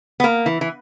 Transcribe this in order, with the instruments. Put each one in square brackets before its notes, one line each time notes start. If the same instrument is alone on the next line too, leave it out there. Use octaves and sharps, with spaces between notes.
[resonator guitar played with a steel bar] B3
A#3
E3
E3